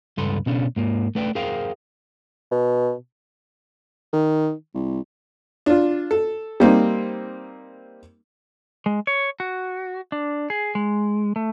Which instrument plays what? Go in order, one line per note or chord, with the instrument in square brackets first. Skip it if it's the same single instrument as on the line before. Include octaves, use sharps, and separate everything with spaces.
[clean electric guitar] C#2 G2 A4 B4 C6
B2 C#4 D4
G#2 A#3
A3 B4 D5 G5
G#4 A#4 C5 F5 G5
[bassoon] B2
[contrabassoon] D#3
C2
[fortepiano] D4 F4
A4
G3 A#3 C4 D#4
[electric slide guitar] G#3
C#5
F#4
D4
G#4
G#3
A3